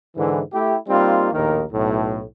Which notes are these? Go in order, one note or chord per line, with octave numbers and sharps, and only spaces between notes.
G#2 D3 E3
A3 E4 G4
G3 A#3 C4 D#4 F4
A#1 D#2 A2 D#3 A#4
B1 A2